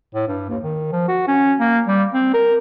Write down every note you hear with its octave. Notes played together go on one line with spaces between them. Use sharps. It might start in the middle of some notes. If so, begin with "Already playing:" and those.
A2
G2
D#2
D#3
F3
F#4
C#4
A#3
G3
C4
A#4